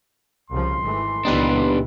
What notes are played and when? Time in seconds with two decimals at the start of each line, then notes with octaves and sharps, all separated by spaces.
0.50 C2 C#3 F3 C6
0.83 G#1 E3 A3
1.25 C#2 A#2 E3 B3 D4 D#4 G4 B4